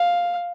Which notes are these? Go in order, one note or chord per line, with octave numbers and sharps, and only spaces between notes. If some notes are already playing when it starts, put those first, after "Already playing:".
Already playing: F5